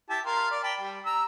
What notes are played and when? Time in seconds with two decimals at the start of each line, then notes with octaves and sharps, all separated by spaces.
0.10 E4 G4 A5
0.26 A#4 F5 C6
0.51 D5
0.63 G5 A5 B5
0.81 G3
1.06 A#5 E6